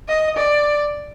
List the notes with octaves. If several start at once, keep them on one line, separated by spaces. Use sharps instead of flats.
D#5
D5